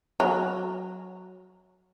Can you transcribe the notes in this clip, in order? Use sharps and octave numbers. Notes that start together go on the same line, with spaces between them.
F#3